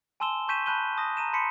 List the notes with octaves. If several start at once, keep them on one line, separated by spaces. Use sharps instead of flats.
G#5 A5 C6 E6 E7 G7
A5 C#6 G6 B6 D#7 E7
A5 B5 F#6 G6 D#7 G7
A5 D#6 A#6
A#5 D#7 E7
A5 B5 C6 B6 C#7